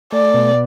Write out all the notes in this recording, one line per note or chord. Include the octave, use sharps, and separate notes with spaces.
A3 D5
B2